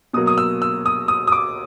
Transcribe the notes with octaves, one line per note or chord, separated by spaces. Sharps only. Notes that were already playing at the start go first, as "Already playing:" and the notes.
B2 F#3 A#3 D#6
D#6
E6
E6
D#6
D#6
D#6
D6